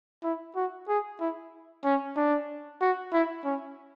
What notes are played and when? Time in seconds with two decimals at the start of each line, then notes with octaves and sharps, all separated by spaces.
0.24 E4
0.56 F#4
0.89 G#4
1.21 E4
1.85 C#4
2.17 D4
2.81 F#4
3.13 E4
3.45 C#4